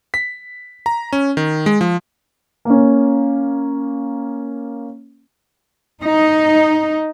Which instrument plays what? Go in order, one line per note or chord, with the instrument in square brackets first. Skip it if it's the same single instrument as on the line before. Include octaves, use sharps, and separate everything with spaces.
[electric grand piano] B6
A#5
C#4
D#3
G#3
F3
[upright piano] A#3 C#4
[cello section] D#4